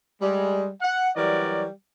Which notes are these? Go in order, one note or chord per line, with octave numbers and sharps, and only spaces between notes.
G3 G#3
F#5
E3 F#3 G3 A#4 C#5 D5